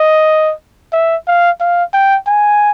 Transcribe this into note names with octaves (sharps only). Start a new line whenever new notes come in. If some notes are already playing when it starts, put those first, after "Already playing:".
Already playing: D#5
E5
F5
F5
G5
G#5